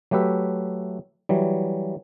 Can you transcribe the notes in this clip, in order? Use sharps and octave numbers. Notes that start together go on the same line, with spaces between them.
F#3 A3 G4 B4 E5
E3 F#3 G3